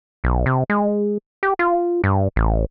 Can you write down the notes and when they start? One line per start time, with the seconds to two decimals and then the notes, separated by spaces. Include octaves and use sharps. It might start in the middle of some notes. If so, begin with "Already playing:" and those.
0.24 B1
0.46 C3
0.70 G#3
1.43 G4
1.59 F4
2.04 G2
2.36 A1